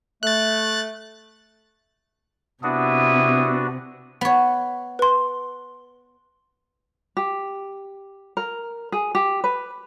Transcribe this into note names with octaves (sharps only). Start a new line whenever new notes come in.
A3 F#6 A6
C3 B3 D4 E4 F#4 D#6
B3 C#5
B4 C6
G4
A#4
G#4
G4
B4